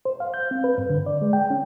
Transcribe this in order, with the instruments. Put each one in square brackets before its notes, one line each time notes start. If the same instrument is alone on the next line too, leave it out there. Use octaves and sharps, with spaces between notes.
[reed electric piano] C5
F5
G6
C4
B4
G2
D3
D5
G#3
G5
C#4